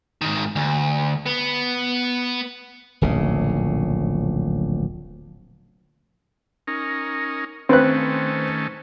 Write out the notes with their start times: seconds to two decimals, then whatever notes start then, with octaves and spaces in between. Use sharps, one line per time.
0.21 G#2 D#3
0.56 D2
1.26 B3
3.01 D1 A#1 C#3
6.67 C#4 D#4 A#4
7.69 D#3 A3 C4 C#4 B4 F#6